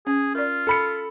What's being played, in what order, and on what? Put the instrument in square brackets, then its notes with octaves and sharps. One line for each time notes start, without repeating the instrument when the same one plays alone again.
[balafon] C#4 [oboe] G#4
[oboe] F4 [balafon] A#4 D5
[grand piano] A4 B5 C#7